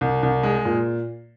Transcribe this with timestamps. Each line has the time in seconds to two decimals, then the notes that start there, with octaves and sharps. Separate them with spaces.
0.01 C2
0.23 C2
0.43 G#3
0.65 A#2